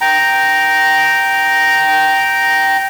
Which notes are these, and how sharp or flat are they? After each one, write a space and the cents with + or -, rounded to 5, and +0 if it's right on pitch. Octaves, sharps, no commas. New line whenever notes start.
G5 -10 A#5 +0